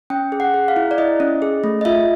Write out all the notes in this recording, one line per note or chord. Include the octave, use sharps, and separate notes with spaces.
C#4 G5
G#4
F#5
G#4
F5
E4
D5
E4 D#5
C#4
G#4
A3
D#5
F4 E5